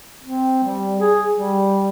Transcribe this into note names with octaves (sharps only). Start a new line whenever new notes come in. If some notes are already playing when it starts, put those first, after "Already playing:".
C4
G3
G#4
G3